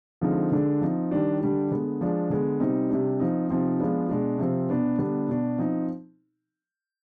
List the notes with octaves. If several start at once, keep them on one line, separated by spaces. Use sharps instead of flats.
D3 F3 G#3 C4 D#4
D3 G#3 D4
F3 C4 D#4
D#3 G3 D4
D3 G3 D4
D3 G#3 B3
F3 G#3 D4
D3 G#3 B3
C3 G3 C4 D#4
C3 G3 D4
F3 C4 D#4
C3 F3 C4 D#4
F3 G#3 B3 D4
B2 G#3 D4
C3 F3 C4
B2 B3 D4
D3 G3 B3 D4
B2 B3 D4
F3 C4 D#4